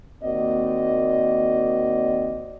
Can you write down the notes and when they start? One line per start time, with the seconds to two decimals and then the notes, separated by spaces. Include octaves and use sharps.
0.23 D#2 A#3 C4 F#4 D5 D#5